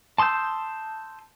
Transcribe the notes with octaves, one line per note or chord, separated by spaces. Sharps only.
A5 C6 D#6 E6 G6